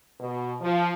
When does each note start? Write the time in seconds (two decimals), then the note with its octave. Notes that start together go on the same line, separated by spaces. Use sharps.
0.20 B2
0.60 F3